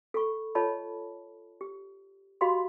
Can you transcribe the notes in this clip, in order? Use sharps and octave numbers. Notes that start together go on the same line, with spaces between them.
A4 B5 C#6
F4 A4 C#5 D#5 A5 B5
G4
F#4 G4 D#5 F5 B5 C6